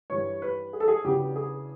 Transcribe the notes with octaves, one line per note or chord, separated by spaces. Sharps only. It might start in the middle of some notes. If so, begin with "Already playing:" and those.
G2 E3 G3 C#5
B4
G#4
A4
G#4
E2 C#3 F#3 B3 D4 G4
G#4